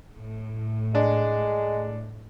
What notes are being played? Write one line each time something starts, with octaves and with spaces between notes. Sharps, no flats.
A2
G#3 D4